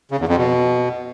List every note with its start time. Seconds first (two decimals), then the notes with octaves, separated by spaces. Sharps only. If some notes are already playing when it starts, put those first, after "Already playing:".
0.11 C#3
0.20 E2
0.28 F2
0.37 B2